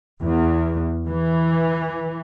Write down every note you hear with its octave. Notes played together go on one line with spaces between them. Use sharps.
E2
E3